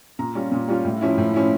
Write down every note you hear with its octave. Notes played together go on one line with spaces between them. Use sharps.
A#2 A#5
G3 C#4 F4
A#2
G3 C#4 F4
A2
F3 C#4 E4
A2
F3 C#4 E4